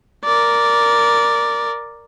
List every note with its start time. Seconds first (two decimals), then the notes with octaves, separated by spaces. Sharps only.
0.25 A#4 D5